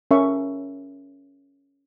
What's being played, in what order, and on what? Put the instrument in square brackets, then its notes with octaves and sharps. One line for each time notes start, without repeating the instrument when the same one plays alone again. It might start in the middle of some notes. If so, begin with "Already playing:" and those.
[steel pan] C#4 A#4 E5 C#6